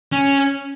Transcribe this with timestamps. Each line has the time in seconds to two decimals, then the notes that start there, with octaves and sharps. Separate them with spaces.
0.12 C#4